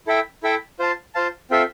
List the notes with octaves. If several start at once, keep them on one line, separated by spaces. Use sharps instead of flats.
E4 A4 E5 G5
E4 A4 E5 G5
F4 C5 F5 A5
F4 C5 F5 A5
C4 F4 A4 E5